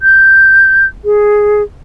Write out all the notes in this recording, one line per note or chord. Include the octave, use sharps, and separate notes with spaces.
G6
G#4